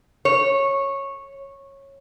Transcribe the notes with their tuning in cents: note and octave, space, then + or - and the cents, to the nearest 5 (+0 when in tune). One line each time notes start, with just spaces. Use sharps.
C#5 -10